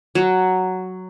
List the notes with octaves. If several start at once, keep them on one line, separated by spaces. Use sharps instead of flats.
F#3